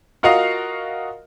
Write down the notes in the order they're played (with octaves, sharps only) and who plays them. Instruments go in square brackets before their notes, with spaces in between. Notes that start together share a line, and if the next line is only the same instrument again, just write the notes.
[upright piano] F4 F#4 A#4 D#5 F5